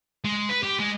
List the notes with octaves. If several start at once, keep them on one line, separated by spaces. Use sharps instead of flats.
G#3
B4
G4
G#3